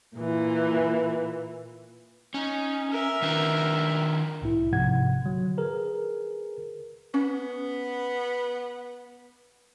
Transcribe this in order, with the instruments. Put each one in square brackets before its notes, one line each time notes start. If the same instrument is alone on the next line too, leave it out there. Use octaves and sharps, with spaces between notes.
[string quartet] A#2 E3
[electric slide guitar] C#4 [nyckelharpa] D#4
[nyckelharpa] A#4 E5
[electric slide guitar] D#3 D4 B4
[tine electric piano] C2 A2 E4
A#1 G#2 C3 F3 F#5 G#6
D3 F#3
G#4 A#4 B4
[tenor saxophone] B3 [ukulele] C#4